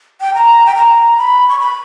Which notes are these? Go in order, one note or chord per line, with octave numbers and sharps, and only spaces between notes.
G5
A#5
G5
A#5
B5
C#6
B5